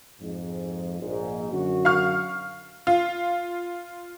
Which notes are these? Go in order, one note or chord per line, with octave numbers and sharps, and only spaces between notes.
F2 G#2
A#1 G#2
F#2 D3 F#4
F5 C#6 F6
F4